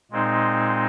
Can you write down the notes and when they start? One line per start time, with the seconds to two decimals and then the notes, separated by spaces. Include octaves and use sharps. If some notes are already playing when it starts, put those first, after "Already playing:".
0.11 A#2 G#3 C4 D#4